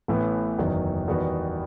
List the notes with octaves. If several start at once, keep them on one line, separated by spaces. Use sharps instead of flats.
A1 A2 E3 B3
F#1 E2 D#3 F#3
E2 D#3 G3 B3 F#4